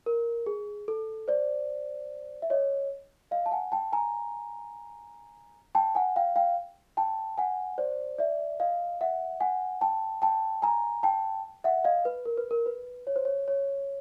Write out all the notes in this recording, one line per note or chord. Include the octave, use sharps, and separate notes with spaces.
A#4
G#4
A4
C5 D5
E5
C#5 D#5
D#5 F5
A5
F#5 G#5
G5 A5
G#5 A#5
G5 A5
F#5 G#5
F5 G5
F5 G5
G5 A5
F#5 G#5
C5 D5
D5 E5
D#5 F5
E5 F#5
F#5 G#5
G5 A5
G5 A5
G#5 A#5
G5 A5
E5 F#5
D#5 F5
B4
A#4
B4
A#4
B4
C#5
C5
C#5
C#5